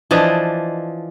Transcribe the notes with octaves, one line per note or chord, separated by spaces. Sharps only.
E3 F3 D4 D#5